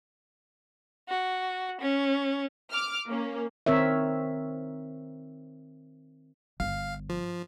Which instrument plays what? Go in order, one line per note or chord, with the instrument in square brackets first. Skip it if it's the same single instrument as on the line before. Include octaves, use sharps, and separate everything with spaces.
[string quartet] F#4
C#4
[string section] D6 F6
A#3 C#4
[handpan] D#3 C4 A#4 C#5 E5
[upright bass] G1 [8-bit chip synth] F5
[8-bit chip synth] F3